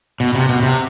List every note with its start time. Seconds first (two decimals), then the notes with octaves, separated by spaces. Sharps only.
0.20 B2
0.35 C3
0.49 B2
0.63 C3